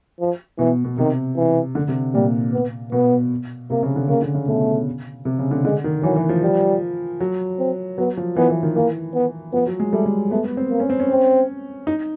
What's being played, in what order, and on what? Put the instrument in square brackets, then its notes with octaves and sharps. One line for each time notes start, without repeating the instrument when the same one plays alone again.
[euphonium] F3
[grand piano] B2 [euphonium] E3
[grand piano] B2
[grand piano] C3 [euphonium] D#3
[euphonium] E3
[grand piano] D3
C3
[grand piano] A#2 [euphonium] G3
[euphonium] B3
[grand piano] B2 [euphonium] B3
[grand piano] C3 [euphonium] A#3
[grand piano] C#3
D3
[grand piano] C#3 [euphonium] A#3
[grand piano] D3
C#3
[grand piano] B2 [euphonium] A3
[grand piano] C3
C#3
D3
[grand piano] D3 [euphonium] G#3
[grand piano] D#3
[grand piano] E3 [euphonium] F#3
[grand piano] E3
F3
[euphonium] G3
[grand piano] F#3
[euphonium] C4
[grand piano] F#3 [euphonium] B3
[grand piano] F3
[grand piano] E3 [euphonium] B3
[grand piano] E3
D#3
[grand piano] E3 [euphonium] A#3
[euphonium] B3
[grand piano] F3 [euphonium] B3
[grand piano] F#3
G#3
[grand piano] G3 [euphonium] A3
[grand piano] G#3
[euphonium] A3 [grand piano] B3
[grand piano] B3
C4
[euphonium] A#3
[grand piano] C#4
C4
C#4
[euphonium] C4
[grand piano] D#4